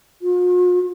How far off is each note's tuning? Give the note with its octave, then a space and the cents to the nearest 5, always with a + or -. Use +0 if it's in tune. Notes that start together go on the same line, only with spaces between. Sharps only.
F4 +45